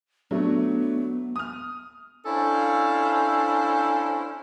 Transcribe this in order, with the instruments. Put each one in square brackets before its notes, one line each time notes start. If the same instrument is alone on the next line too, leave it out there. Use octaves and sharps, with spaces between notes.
[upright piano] F#3 A3 D4 [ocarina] B3
[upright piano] D#6 F6
[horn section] C#4 D4 E4 A4 C5 F5